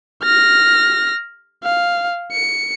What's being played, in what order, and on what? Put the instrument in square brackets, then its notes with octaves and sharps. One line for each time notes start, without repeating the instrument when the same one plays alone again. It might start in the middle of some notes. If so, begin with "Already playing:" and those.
[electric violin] F6 A#6
F5
C#7